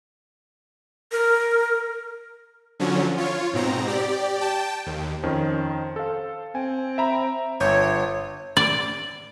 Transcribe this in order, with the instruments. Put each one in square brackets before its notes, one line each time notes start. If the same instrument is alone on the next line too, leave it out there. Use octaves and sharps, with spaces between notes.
[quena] A#4
[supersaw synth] D3 F3 F#3 C#4
F4 C#5
G#2 B2 C4 A#5
G4 D5
G5 A5
D#2
[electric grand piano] F2 D#3 C#4 [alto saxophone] C5
[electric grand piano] A4 F5
[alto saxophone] C4 [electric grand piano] G#5
[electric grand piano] E5 A#5 B5
[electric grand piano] G1 G6 [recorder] C#5 [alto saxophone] E5
[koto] D5